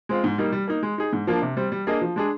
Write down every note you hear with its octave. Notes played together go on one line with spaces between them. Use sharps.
G#3 C4 F4
G#2
G3 A#3 D#4
G3
A#3 D#4
G#3
D#4 G#4
G#2
F3 A#3 D4
C3
G3 C4
G3
A#3 D4 G#4 D#5
F3
G#3 D4 G#4